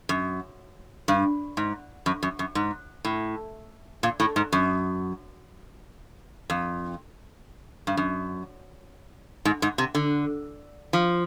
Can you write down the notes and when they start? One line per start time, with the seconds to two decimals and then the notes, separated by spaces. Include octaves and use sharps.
0.09 F#2
1.08 G2
1.57 G#2
2.06 F#2
2.23 F#2
2.39 F#2
2.55 G#2
3.05 A2
4.03 A#2
4.20 A2
4.36 G#2
4.52 F#2
6.50 F2
7.87 G2
7.97 F#2
9.45 G#2
9.62 G#2
9.78 C3
9.95 D3
10.93 F3